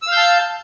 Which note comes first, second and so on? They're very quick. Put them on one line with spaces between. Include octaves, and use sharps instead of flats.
E6 F5 G6 A5